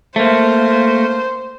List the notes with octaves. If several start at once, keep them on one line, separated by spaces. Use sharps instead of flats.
A3 A#3 C5